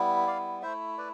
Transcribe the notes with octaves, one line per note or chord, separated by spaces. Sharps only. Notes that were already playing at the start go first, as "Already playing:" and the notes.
Already playing: G3 B3 E4
D5 F5
A3 E4 C5 E5
B4 D5